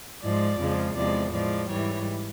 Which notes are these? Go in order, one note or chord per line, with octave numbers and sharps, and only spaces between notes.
G#2 F3 G#3 D5
F2 C#3 F3 G#3
E2 C3 F3 G#3 D5
A2 F3 G#3 D5
G#2 E3 G3 C#5